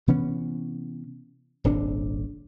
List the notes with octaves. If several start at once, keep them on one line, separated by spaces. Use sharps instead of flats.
C3 E3 B3 C#4
D#1 G#1 C3 D4